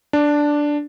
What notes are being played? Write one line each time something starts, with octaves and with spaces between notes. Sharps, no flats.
D4